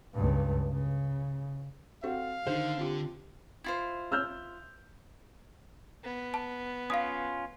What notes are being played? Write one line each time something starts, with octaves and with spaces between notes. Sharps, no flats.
C#2 G2
C#3
C4 F#4 A4 F5
D3 D#3 C5
C4 F4 G4
E4 F4 C5
E6 F6 G6
B3
A5
C#4 F4 F5 D#6